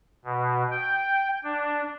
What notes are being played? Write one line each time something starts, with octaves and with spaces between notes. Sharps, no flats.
B2
G5
D4